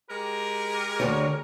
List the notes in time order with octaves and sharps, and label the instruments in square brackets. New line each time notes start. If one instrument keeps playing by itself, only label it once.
[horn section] G#3 G4 A#4
[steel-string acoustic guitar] D2 G#2 C#5